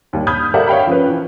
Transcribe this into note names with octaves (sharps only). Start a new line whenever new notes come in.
D#2 G3
B5 D#6 F6 G6 G#6
G4 A4 A#4 D5 E5 F#5
C#5 F5 G5 B5
F3 C#4 B4
E3